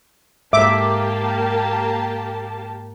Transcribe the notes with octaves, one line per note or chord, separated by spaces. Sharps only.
G#2 A#3 G4 E5 A5 D6